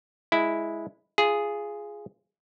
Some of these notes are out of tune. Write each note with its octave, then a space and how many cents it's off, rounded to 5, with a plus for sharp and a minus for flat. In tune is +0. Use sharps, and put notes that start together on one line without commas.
G#3 +5 E4 +0
F4 -20 G#4 +0